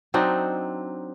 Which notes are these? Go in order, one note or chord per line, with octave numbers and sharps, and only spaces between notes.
F#3 C4 D4 D#4